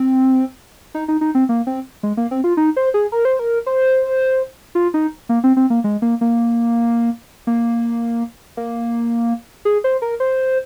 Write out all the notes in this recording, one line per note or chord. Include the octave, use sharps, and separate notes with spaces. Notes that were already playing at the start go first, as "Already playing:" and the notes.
Already playing: C4
D#4
D#4
D#4
C4
A#3
C4
G#3
A#3
C4
F4
D#4
C5
G#4
A#4
C5
A#4
C5
F4
D#4
A#3
C4
C4
A#3
G#3
A#3
A#3
A#3
A#3
G#4
C5
A#4
C5